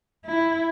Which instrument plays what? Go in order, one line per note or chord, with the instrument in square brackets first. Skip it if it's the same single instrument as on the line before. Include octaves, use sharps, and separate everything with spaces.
[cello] E4